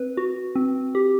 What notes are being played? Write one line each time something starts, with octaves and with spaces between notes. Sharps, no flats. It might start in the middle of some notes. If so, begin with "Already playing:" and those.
Already playing: C4 B4
F#4
C4
G4